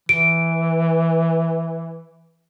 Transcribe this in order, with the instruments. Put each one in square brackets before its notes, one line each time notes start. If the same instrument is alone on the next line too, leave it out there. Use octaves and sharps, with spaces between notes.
[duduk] E3 [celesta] D7